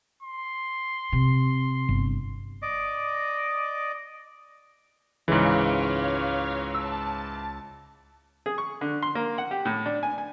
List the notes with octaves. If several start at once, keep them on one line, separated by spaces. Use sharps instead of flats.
C6
C3
G1
D5 D#5 D6
C#2 G#2 E3 C#5 F5 C#6
A5 E6
G#4
C#6
D3
C6
A#3
F#5
G4
A2
D4
G#5
G#5